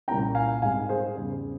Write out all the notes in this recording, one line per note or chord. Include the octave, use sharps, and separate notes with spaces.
C2 A#2 G3 C#4 E4 G5 A#5
F5 G#5
G#2 G3 C4 F5 G#5
G#4 C5
E2 C#3 G3 G#4